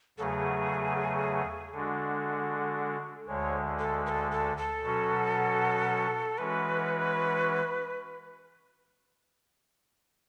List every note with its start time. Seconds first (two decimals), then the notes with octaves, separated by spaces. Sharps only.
0.18 E2 C#3 F#3 A3 G#4 A4
1.73 D3 G#3 D4 F#4 A4
3.28 D2 D3 G#3 C#5
3.79 A4
4.06 B4
4.09 A4
4.31 A4
4.57 A4
4.82 B2 F#3 C#4 F#4
6.38 E3 G#3 C#4 F#4 B4